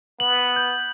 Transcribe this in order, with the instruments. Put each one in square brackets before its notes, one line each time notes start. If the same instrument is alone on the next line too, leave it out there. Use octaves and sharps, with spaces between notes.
[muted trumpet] B3 [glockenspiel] F#7
[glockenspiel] G6